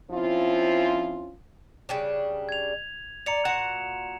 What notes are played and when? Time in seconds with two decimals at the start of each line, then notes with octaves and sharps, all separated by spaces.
0.11 F3 C4 C#4 E4 F4
1.89 C#3 G3 D4
2.49 G#6 F7
3.26 D5 A#5 C#7 F7
3.45 A#2 F#4 F#5 C#7 E7